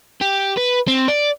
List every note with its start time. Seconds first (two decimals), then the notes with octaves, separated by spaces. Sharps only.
0.21 G4
0.57 B4
0.88 C4
1.08 D5